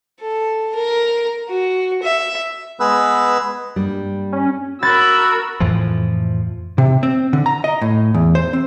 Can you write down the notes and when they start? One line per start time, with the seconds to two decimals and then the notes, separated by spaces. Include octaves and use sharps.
0.20 A4
0.75 A#4
1.49 F#4
2.03 E5
2.80 G#3 B3 G#4 B4 E6
3.76 G2 G3 A#3
4.32 C#4
4.83 F#4 A#4 B5 E6 A6
5.60 F2 A2 E3 F3
6.78 C3
7.03 C4
7.33 D3
7.46 A#5
7.64 D#5
7.82 A2
8.14 E2
8.35 C5
8.53 C4